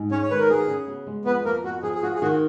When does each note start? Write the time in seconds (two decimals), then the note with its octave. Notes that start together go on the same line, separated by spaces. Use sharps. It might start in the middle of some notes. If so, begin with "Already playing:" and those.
Already playing: G#2
0.11 G#3 C#4 C#5
0.22 C#5
0.30 D#3 B4
0.39 A#4
0.50 F#4 G#4
0.68 C#3
0.87 B3
1.07 G#3
1.25 F2 B3 B4
1.45 F2 A#3 A#4
1.64 B3 F#4
1.83 F3 G#4
1.94 G#4
2.02 F4 F#4
2.15 G#4
2.22 D#3 F#4